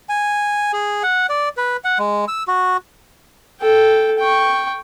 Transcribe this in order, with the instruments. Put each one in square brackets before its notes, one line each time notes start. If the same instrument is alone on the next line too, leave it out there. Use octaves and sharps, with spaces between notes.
[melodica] G#5
G#4
F#5
D5
B4
F#5
G#3
E6
F#4
[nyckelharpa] A4 G5
G5 C#6